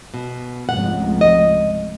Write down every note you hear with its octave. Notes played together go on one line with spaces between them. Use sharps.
B2
F1 C#2 G#2 F#5
D#5